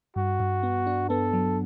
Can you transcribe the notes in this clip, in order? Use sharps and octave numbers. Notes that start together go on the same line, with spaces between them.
G2 F#4
G2
B3
D4
B3 A4
F#3